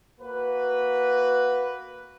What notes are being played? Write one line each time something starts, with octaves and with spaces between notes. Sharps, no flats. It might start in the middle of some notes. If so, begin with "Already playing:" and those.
A#3 F#4 B4